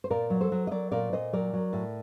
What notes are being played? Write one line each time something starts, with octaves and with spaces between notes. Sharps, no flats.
C5
A#2 A#4 D5
F#3
A4 C5
F#3
D#5
F#3 A#4 D5
A#2 A#4 D5
A#2 C5 D#5
F#3 A#4 D5
F#3
A2